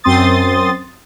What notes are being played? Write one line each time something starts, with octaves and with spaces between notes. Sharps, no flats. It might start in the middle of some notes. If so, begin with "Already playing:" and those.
F#2 C4 C6 D#6 A6